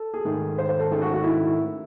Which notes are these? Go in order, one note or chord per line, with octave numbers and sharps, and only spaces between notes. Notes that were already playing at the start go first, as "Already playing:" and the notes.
Already playing: A4
G#4
G#2 D#3 A3
C5
C5
A4
G#2 D#3 A3 C#4 G#4
F#4
F#4
E4